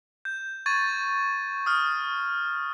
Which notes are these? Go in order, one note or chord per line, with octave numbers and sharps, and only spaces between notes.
G6
C#6 G#6 A6 D#7
D#6 F6